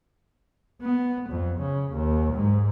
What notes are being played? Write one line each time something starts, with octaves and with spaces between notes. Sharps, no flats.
B3
F2
C#3
D#2
G#2